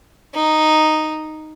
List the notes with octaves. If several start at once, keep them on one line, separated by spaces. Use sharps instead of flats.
D#4